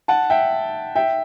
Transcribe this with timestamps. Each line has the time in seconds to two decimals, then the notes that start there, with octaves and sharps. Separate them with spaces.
0.08 F#5 A5
0.30 E5 G5
0.96 E5 G5